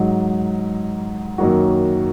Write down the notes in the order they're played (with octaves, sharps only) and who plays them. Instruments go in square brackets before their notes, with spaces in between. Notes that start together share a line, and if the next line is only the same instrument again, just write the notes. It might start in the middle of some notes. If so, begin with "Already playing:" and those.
Already playing: [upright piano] G#2 F#3 D#4
F#2 D#3 F#3 A#3 F#4